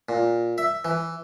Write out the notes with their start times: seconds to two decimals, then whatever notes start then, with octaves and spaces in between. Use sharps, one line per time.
0.09 A#2
0.58 E5
0.85 E3